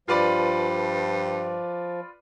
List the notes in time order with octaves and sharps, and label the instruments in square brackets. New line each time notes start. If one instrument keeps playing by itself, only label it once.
[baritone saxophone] G2 [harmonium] F3 [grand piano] F4 B4 D5